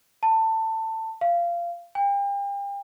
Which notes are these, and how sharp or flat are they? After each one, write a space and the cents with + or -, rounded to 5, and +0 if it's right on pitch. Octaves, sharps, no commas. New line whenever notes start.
A5 +20
F5 -20
G5 +40